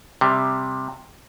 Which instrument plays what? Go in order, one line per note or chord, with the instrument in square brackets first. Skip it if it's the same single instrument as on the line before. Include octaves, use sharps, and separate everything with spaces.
[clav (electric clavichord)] C3 G3